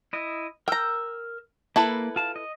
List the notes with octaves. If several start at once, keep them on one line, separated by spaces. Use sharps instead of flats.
E4 D#5
A#4 G5 A#5 E6
A#3 E4 A4 B4
F4 A5
D#5